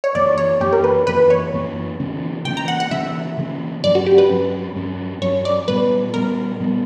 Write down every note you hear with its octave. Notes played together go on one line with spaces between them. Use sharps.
C#5
F#2 E3 A#3 D5
C#5
F#2 E3 A#3 G4
A#4
B4
F#2 E3 A#3 B4
C#5
F#2 E3 A#3
C#3 E3 A#3 C#4
C#3 E3 A#3 C#4 G5
A#5
F#5
F#5
C#3 E3 A#3 C#4 E5
C#3 E3 A#3 C#4
G2 F#3 C#4 D5
F#4
G4
B4
G2 F#3 C#4
G2 F#3 C#4
G2 F#3 C#4 C#5
D5
A#2 G3 B3 B4
A#2 G3 B3 A#4
A#2 G3 B3